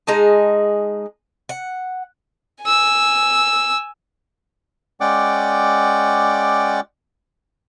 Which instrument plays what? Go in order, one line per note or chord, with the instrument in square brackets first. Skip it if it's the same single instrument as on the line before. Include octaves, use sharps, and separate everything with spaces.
[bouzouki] G#3 D#4 G#4 A5
F#5
[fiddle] G#5 E6
[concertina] G#3 C#4 D5 F#5 G5 D6